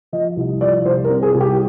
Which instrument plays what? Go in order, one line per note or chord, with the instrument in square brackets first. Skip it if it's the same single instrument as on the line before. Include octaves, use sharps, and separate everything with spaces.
[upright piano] F3 D#5
C2
F3 D5
C2 C5
A#4
C4
G#4
C2
G4